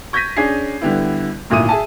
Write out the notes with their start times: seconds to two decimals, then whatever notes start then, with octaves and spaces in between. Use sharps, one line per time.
0.13 C#6 G6 G#6 A#6 B6 D#7
0.36 C#4 D4 G#4 G#5 G#6 C7
0.81 D3 G3 B3 E4
1.50 G#1 D2 A#2 E4 D#6 D#7
1.69 G#4 E5 G#5 A5